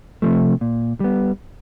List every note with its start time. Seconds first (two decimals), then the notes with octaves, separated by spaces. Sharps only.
0.22 C3 F3 A3
0.61 A#2
1.00 G3 B3